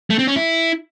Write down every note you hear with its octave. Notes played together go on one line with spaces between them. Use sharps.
A3
C4
C#4
E4